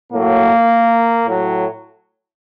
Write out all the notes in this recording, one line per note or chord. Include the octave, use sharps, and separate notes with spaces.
A2 F#3 A#3
A2 F#3